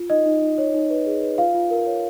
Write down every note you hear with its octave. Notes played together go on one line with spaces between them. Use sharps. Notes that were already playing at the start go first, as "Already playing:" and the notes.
Already playing: F4
D#4 D#5
D#4
D#4
C#5
D#4
B4
G#4
B4
F4 F5
F4
A#4
C#5